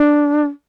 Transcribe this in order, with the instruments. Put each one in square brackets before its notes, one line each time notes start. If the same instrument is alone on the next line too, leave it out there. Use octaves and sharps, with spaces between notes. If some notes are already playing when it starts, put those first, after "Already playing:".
Already playing: [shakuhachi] D4